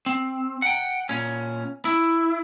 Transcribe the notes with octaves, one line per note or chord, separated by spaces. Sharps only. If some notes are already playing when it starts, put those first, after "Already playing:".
C4
F#5 G5
A#2 C#4
E4